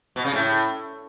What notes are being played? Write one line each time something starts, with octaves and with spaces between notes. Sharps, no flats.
B2
C#3
A2